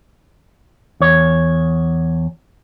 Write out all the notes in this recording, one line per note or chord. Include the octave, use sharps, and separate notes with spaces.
E2 C#5